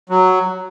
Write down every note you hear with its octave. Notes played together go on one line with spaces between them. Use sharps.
F#3